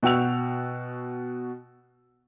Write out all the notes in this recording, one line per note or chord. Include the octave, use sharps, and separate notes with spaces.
B2 F#4 G5 E6 F7